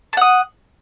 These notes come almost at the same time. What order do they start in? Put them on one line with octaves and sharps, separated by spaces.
A5 F#5 D#6